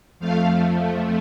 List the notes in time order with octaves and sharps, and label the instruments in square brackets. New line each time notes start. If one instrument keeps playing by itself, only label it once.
[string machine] F2 F3 A3 F5